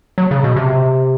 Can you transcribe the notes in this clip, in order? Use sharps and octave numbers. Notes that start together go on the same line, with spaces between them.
F#3
C#3
B2
C3